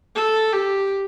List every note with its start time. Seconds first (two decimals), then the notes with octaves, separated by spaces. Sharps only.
0.16 A4
0.53 G4